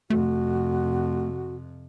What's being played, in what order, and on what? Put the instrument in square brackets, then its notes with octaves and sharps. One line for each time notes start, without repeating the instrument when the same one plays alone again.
[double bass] F2 C3 [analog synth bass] A3 [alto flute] F#4